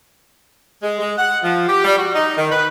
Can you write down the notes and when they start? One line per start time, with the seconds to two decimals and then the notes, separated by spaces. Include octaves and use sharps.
0.83 G#3
0.99 G#3
1.18 F#5
1.43 F3
1.68 G4
1.85 G3
1.98 F#4
2.14 D#4
2.37 D#3
2.52 B4